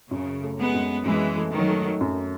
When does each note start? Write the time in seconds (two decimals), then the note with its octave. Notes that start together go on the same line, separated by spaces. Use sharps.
0.10 F#2 C#3
0.42 A3
0.58 G#3 B3
0.74 F#2
1.05 F#2 E3 G#3
1.37 A3
1.52 D#3 F#3
1.68 A3
2.01 F#2